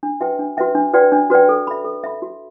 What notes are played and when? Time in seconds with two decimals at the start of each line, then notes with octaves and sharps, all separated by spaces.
0.03 D4
0.20 F#4 B4 E5 G5
0.39 D4
0.57 F#4 B4 E5 G5
0.75 D4
0.94 F#4 B4 D5 G5
1.12 D4
1.30 F#4 B4 D5 G5
1.49 A4
1.67 E5 B5
1.85 A4
2.04 E5 B5
2.22 F#4